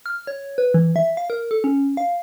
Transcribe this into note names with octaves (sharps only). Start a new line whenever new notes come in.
F6
C#5
B4
E3
E5
F5
A#4
A4
C#4
F5